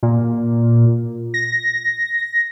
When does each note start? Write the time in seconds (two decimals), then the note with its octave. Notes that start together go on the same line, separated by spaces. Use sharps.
0.03 A#2
1.34 A#6